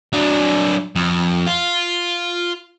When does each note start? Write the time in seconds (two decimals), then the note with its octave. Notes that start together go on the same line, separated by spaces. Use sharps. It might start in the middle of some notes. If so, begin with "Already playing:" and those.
0.13 F#3 D4
0.96 F2
1.47 F4